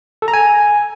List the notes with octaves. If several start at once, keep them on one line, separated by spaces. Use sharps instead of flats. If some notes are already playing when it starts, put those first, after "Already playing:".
A4
A#5
G#5